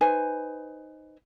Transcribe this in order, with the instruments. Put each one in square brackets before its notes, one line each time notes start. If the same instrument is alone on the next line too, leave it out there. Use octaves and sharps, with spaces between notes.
[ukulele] D#4 B4 C5 G#5